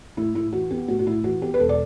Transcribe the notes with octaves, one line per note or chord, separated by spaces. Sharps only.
A2 E4
A2 E4
E3 F#4
B3 G4
A2 F#4
F#4
A2 E4
E3 F#4
B3 G4
B4
E1 A4
D5